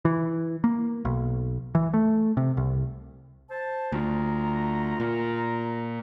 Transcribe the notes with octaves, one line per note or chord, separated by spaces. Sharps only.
E3
A#3
B1
E3
A3
C3
C2
C5 A5
D2 F4 A#5
A#2